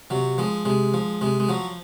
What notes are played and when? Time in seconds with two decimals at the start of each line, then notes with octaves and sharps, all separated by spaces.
0.10 C3 F#3
0.38 F3 G#3
0.65 C3 G#3
0.94 F3
1.21 C3 G#3
1.40 G#3
1.49 F3 F#3